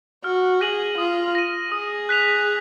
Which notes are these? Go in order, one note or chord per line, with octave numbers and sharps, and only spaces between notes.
F#4 F6
G#4 A#6 D#7 F#7
F4 D#6
A#6 D#7
G#4 D#6
F#6 B6 F7